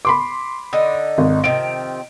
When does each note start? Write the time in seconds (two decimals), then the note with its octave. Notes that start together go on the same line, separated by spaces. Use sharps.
0.05 B5 C6 D6
0.73 D3 D#4
1.18 G#1
1.44 C3 D#3 F3 D7